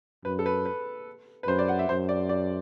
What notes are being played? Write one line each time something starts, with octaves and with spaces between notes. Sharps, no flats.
F#2 B4
A4
B4
B4
B4
F#2 C5
D5
F#5
E5
F#2 C5
D5
D5